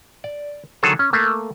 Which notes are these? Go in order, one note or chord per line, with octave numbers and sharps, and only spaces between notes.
D5
D3 D#3 F#3 G#4 A4 C#5
C#4
A3 A#3